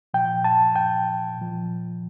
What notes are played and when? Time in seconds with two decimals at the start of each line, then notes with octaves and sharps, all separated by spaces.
0.14 A#2 F3 G5
0.44 A5
0.76 G5
1.37 A#2 F3